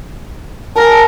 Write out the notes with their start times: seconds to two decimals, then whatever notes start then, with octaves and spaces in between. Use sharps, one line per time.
0.76 A#4 G#5 A5